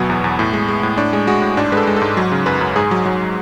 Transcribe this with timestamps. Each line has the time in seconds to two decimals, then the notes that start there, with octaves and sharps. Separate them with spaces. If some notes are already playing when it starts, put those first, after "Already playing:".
Already playing: D2 B2 F#3 B3
0.09 E2
0.24 E2
0.39 A2
0.53 G#3
0.68 G#3
0.83 A2
0.97 A2 D4
1.13 G#3
1.27 G#3 F#4
1.42 A2
1.57 G#2 D4
1.72 G#3 B4
1.77 A4
1.87 G#3
1.96 A4
2.02 G#2
2.17 F#3
2.32 C#3
2.46 F#2 B4
2.61 F#2
2.76 G#2 G#4
2.91 F#3
3.06 F#3